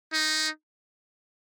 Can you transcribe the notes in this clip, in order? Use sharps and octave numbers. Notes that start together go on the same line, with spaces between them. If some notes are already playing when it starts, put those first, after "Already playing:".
D#4